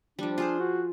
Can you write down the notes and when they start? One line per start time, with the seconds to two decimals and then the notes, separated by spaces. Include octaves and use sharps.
0.19 F3 G3 D4
0.38 F4 G#4 C5
0.60 F#4